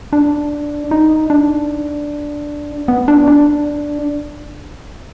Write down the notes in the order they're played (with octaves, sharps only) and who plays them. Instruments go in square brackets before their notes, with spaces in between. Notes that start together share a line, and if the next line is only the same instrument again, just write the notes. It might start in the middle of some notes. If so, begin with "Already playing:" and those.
[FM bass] D4
D#4
D4
B3
D4
D4